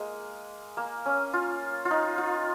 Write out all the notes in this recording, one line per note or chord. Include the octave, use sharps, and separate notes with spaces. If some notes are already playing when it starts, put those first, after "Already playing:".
Already playing: G#3 A#3
A#3
C#4
F4
F4
D#4
F4